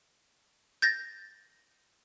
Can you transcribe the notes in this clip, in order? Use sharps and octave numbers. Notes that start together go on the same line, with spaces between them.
G6 A6 A#6